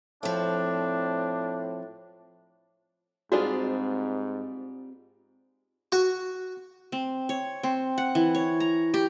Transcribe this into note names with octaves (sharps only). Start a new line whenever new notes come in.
A2 F3 C4 D4
G#2 G3 C4 D4 F4 F#4 G#4 D#5
F#4
C4
C#5
C4
F#5
E3
C#5
A#5
G4